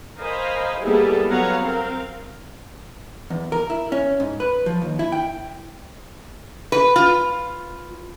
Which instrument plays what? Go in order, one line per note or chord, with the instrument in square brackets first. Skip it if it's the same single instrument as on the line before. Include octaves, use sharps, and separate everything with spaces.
[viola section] A#4 C5 D#5 F5 G#5 B5
G3 A#3 B3 E4 G#4 A4
F#3 B3 C#5 F5 F#5 A#5
C4 A#4 F5
[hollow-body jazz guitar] E2
A#4
E4
C#4
G#2
B4
F3
D#2
E4
G5
[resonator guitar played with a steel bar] B4
F4